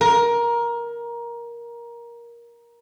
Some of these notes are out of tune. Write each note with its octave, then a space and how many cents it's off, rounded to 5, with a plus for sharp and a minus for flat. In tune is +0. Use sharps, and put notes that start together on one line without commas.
A#4 +15